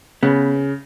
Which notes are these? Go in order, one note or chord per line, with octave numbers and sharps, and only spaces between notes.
C#3 B3